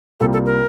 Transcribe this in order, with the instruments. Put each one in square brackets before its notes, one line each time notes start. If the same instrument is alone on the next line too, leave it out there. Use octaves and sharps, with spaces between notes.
[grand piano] C2 C3 G3 A#3 F4 [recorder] A4
[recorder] A4
A#4